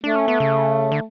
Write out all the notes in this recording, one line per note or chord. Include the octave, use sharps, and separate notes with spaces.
A3 D4
C#4
B3
C#3
D3